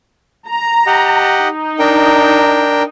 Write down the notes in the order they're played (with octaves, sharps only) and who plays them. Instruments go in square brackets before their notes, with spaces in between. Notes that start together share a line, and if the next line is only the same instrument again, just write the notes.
[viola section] A#5
[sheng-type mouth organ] G4 D#5 F#5
[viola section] D#4
[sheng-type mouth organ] D4 A#4 G5